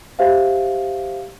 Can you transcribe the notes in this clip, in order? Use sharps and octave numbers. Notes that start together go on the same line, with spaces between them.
G4 C5 E5 F5